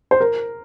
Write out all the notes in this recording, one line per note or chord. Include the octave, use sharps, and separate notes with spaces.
C5
A#4